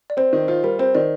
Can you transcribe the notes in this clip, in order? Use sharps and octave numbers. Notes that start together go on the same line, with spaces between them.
D5
C4 C5
D#3
F4 C5
G3 A#4
C4 C5
D#3 D5